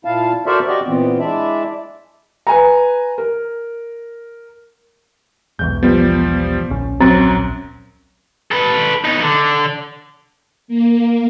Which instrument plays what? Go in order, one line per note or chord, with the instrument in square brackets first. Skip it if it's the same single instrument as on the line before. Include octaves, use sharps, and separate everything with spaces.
[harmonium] A#2 E4 F5 A5
F#4 A4 A#4 C5 D5 E5
F#4 G4 D5 D#5
A#2 E3 B3 C4
G#3 D4 E4 D5 E5
[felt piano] B4 G#5 A#5
A#4
[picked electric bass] B1 E2 G#2 [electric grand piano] G6
[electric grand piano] F3 G3 [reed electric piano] B3
[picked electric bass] D1 A#1 C#4
[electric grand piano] F#2 F#3 [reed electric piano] C4 A#5 A6
[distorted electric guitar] A4 B4
B3 D#4
D3
[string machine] A#3